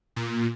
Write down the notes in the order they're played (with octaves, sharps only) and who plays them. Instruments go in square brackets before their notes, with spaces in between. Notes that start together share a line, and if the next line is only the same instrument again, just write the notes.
[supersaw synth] A#2